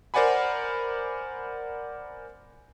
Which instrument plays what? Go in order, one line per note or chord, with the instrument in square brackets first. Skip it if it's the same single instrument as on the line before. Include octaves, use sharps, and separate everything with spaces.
[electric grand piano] A#4 C5 D5 F#5 G#5 B5